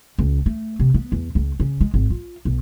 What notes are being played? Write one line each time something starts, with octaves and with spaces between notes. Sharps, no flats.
C#2
A3
C3
B3
E2
C#2
C#3
G#3
G#1
F4
B1